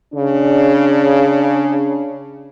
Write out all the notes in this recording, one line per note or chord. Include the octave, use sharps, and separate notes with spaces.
C#3 D4